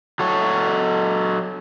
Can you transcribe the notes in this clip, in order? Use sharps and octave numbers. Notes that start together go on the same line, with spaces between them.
F#3 A4 C#5